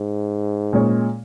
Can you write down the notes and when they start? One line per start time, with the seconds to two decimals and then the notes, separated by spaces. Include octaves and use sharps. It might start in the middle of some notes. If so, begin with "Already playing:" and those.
Already playing: G#2
0.73 A#2 G#3 C#4 G#4 C#5